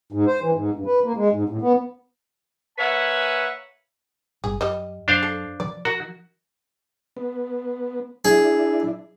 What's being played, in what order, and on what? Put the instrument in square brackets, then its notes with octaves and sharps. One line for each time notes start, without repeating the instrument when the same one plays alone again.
[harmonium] G#2
C5
E3
G#2
G2
B4
A#3
G#3
G#2
A2
B3
[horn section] A#3 B4 C#5 E5 F#5 G#5
[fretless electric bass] G1 G2 [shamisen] G#4
[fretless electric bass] F#2 [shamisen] G3 D#5
[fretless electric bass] F#2 [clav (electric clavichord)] D4 C5 F5
[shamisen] A4
[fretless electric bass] F3 [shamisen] D5
[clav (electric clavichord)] F#4 [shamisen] A#4
[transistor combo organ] B3
[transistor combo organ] D4 E4 [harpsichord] G#4